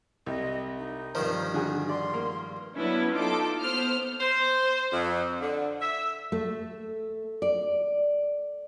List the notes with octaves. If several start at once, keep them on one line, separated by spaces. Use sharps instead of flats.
C2 D#5
D#4
G2 D#3 F3 A#4 C5
D3 F#4 G#4
D5 C6
A#3 A#4
F#3 B3 C#4 D4 E4 B4
D#4 F4 A4 D6
B3 C5 F6
C5
F2
D3
E5
A3
D5